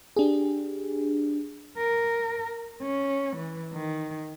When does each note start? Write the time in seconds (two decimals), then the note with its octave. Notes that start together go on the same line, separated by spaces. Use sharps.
0.16 D4 G4 G#4
1.77 A#4
2.82 C#4
3.36 E3
3.73 D#3